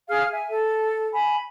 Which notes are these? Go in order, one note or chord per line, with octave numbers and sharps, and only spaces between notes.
G#4 F5 F6
E5 G#5
A4
G#5 B5